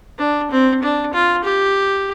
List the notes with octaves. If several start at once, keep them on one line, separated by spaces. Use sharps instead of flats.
D4
C4
D4
F4
G4